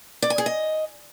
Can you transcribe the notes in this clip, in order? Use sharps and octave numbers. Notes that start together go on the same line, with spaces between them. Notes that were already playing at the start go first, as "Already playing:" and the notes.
D5
G#5
G#4
D#5